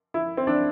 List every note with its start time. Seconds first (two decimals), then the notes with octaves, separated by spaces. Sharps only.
0.14 E4
0.37 C4
0.47 D4